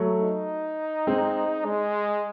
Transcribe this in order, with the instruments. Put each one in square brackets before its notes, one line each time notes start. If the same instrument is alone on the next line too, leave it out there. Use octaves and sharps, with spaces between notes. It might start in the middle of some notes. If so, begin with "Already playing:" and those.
Already playing: [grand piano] F#3 A3
[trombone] D#4
[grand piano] G#3 C4
[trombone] G#3